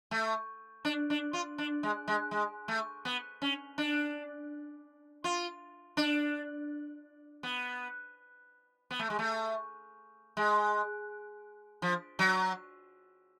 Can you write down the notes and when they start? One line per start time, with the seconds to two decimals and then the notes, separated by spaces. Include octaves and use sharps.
0.11 A3
0.85 D4
1.10 D4
1.33 F4
1.58 D4
1.83 G#3
2.08 G#3
2.31 G#3
2.68 A3
3.05 B3
3.42 C#4
3.78 D4
5.24 F4
5.97 D4
7.43 B3
8.91 B3
8.99 A3
9.10 G#3
9.19 A3
10.37 G#3
11.82 F3
12.19 F#3